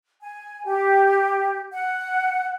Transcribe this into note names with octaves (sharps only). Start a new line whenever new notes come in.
G#5
G4
F#5